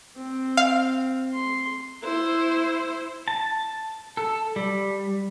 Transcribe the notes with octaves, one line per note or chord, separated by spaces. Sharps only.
C4
F5
C6
E4 C5
A5
A4
G3